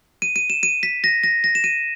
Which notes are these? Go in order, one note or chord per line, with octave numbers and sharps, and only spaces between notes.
D#7
D#7
E7
D#7
B6
A#6
A#6
A#6
E7
D#7